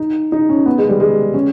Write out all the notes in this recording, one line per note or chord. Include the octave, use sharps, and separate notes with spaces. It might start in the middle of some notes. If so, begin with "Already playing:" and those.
Already playing: D#4
D#4
C#4
B3
G#3
G3
G#3
C#4